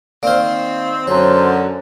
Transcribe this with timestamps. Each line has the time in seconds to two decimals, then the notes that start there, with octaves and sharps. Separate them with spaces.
0.23 D#3 A#3 C4 C5 D5 F6
1.07 F#2 D3 F#3 C5 C#5 A#5